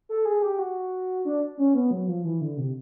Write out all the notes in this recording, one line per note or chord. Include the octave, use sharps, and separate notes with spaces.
A4
G#4
G4
F#4
D4
C#4
B3
F#3
F3
E3
D3
C3